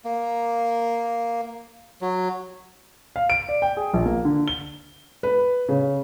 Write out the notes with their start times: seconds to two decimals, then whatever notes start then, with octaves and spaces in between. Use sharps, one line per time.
0.04 A#3
2.01 F#3
3.16 F5
3.30 D7
3.49 D5
3.62 G5
3.77 G#4
3.94 A#1
4.06 A#3
4.25 D3
4.48 G7
5.23 B4
5.69 C#3